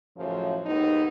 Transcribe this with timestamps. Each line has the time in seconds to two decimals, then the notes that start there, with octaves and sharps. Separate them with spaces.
0.17 F#2 A2 C#3 F3
0.66 D#2 G#2 B3 D#4